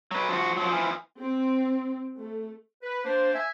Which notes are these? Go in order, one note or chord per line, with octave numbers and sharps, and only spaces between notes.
F#3 B4
F3 F#4
F3 F#3
E3 F3
C4
A3
B4
A#3 D4 C5
E5 G#5